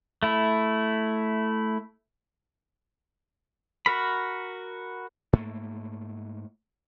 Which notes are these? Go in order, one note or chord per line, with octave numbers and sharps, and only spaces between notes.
A3 E4
F#4 A#4 B5
G#2 A3 A#3